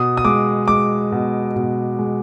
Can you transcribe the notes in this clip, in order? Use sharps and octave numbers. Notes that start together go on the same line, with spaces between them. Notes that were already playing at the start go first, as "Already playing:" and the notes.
Already playing: B2 D#6
D#6
G#3 D6
G#3 D6
B2
B2
G#3